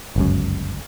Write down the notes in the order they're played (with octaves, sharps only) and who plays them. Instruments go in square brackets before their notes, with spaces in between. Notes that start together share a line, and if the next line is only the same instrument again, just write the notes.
[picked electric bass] G1 C#2 F#2